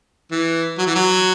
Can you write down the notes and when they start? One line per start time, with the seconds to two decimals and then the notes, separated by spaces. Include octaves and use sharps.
0.31 E3
0.78 F#3
0.86 E3
0.95 F#3